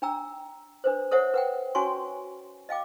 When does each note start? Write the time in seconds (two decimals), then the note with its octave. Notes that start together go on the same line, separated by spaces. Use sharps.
0.02 D4 G5 A#5 E6
0.84 D4 B4 C5
1.11 A4 C5 C#5 E5 F#5
1.34 B4 F#5 G5
1.75 C#4 F#4 C#5 G#5 C6 C#6
2.69 D#5 F5 G5 D6